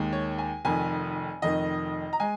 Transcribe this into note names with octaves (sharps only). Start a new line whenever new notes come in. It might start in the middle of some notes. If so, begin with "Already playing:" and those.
Already playing: D#2 D#3 G#3
C#5
G#5
F1 F2 D#3 G#5
F1 F2 D#3 D#5
A#5
G#3 G#5